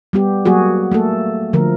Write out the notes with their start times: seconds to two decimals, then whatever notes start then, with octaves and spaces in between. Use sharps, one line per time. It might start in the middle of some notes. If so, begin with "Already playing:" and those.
0.13 G3 B3 G4
0.45 F#3 A#3 F#4 G#4
0.92 A3 A#3 A4
1.53 D3 F3 A3 A#4